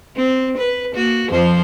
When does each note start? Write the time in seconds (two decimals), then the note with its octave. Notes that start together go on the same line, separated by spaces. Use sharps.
0.16 C4
0.58 B4
0.94 A#3 F#4
1.30 F2 F3 C5